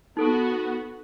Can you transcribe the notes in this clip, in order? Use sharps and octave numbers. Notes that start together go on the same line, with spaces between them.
B3 D#4 F#4 A4 D#6